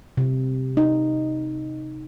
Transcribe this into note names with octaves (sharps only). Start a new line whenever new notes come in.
C3
D#4